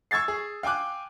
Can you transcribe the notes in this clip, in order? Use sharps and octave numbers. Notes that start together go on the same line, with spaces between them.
C#6 E6 G#6 A6 C7
G#4
F5 G5 G#5 D6 F#6